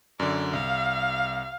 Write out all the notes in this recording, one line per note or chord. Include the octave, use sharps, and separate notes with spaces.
F#2 D3 D5
C2 F5